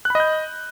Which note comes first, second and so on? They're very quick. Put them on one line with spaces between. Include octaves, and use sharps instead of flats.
F#6 B5 D#5 G6